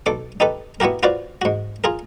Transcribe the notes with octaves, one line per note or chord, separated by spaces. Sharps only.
B1 A4 D6
D#4 G4 A4 B4
B3 E4 F#4 G4 A#4
F4 F#4 B4 C5 D5
G#2 F#4
F4 G#4 A#4